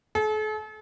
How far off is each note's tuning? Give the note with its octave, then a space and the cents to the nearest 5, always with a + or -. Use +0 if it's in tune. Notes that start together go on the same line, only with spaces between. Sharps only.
A4 -45